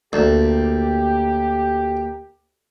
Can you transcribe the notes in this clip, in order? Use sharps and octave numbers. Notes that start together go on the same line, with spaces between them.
D2 A#3 G4 A5